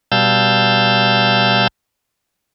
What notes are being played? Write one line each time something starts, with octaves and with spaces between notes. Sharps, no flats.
B2 G3 F5 A5 E6 G6